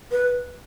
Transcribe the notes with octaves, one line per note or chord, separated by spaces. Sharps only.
B4